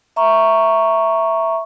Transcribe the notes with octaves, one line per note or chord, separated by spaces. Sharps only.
E5 A#5 C#6